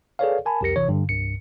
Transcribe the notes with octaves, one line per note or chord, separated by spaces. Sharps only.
G#4 A4 B4 C#5 D5 F5
A#4 G#5 A5 B5
C2 F2 G4 A#4 A#6 C#7
G#1 C3 E3 C#5
G2 D3
C2 G2 C#7